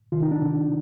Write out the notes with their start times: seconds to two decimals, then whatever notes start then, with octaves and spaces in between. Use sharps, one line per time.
0.12 C3 D#3 F4
0.22 D#4
0.32 D4
0.42 C3 D#3